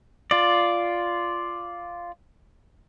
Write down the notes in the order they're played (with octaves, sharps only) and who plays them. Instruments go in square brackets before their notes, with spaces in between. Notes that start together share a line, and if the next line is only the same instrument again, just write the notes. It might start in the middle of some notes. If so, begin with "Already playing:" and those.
[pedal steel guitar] F4 D5